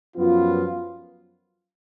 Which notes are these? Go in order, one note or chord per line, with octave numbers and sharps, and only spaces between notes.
F#2 F3 B3 F4